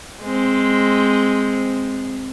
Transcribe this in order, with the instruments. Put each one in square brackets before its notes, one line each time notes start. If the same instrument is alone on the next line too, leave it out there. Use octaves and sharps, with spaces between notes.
[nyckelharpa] G#3 C4